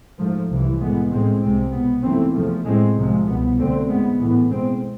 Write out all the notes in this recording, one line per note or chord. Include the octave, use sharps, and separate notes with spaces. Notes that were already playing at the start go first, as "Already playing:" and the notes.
G#2 F3 A3
C2 C3 E3
A2 E3 G#3 B3
A2 G#3 C4
C2 C3 G#3 C4
B2 B3
G#2 E3 A3 C4
E2 C3 F3 A3
A2 G#3 C4
C2 C3 F3 G#3
C2 B2 B3
D2 D3 A3 C4
G#2 G#3 B3
A2 E3 B3
B2 G#3 C4